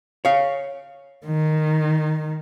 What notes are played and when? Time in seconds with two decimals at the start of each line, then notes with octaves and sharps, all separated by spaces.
0.25 C#5 F5
1.26 D#3